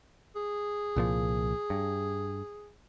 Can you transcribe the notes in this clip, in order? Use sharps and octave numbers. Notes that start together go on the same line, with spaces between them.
G#4
C2 A#2 F3
G2